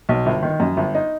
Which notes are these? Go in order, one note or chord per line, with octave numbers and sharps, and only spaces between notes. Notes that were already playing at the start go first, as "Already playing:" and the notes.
B1
G1
D#3
F#2
G1
D#4